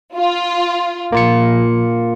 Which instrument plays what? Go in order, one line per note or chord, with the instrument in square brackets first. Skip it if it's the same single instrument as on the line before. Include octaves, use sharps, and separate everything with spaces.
[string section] F4
[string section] A#1 [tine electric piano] A#3 F4 C#7